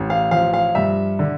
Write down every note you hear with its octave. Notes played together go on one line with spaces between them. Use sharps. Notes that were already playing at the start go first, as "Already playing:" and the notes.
Already playing: A1
F5
F3 F5
F5
G2 E5
D3